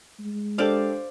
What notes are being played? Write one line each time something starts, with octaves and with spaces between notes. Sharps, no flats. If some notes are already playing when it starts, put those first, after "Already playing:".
G#3
D4 G4 A4 C5 D5 F5